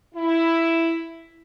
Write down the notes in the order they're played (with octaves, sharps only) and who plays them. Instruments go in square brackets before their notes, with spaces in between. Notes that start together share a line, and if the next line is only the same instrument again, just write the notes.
[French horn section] E4